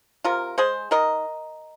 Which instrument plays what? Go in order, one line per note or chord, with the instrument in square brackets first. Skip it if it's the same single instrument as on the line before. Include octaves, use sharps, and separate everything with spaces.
[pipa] C3 F4 A#4
G#3 G#4 C5
D#3 A#4 D#5